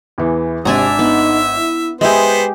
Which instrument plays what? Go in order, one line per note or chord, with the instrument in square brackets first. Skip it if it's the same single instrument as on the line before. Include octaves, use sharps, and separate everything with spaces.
[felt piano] E2 E3
[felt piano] G#1 [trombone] C3 [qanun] D4 G#5 A#5 [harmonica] E5
[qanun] B3 [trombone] D#4
[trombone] E4
[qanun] G#3 G4 [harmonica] B3 C5 [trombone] B4 [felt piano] D#5 E5 G#5